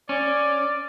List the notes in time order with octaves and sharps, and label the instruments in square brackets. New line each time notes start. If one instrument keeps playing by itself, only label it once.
[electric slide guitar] C#4 [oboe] D5